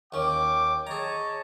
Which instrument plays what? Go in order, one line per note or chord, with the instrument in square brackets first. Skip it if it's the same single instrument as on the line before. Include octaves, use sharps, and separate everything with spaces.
[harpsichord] D#2 C#4 [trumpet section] G5 D6
[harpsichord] G#4 A#5 [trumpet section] C#5 D#5 A5